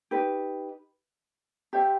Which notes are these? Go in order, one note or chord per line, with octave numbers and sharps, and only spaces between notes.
D#4 G4 B4
G4 C5 E5